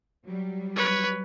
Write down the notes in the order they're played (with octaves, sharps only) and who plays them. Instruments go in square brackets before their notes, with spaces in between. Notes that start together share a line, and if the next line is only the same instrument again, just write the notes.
[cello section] F#3 G3
[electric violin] B4 C#5